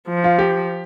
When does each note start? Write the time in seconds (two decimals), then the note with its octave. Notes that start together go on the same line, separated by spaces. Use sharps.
0.09 F3
0.24 F4
0.39 G4